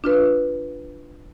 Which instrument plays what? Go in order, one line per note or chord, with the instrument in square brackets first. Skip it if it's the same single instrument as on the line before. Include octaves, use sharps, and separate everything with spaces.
[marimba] D4 F4 B4